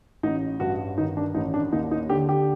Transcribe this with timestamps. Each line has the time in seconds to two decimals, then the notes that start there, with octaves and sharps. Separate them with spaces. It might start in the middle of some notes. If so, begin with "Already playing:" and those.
0.23 A1 D#4
0.60 G2 F#4
0.98 D#3 D#4
1.17 D4
1.35 A1 D#4
1.54 D4
1.73 D#2 D#4
1.91 D#4
2.10 D3 G4
2.29 G4